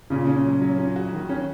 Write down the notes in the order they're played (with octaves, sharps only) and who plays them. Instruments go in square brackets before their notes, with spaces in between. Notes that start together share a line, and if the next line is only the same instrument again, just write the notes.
[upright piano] A#2 [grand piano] C#3
[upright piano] C#4
F#3
F#3
C#4
F#4
D#3
C#4